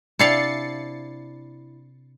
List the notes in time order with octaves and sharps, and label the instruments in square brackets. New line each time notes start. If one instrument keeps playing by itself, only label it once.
[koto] C3 D5 F5 [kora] D4 E4 [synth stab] A6 C7 C#7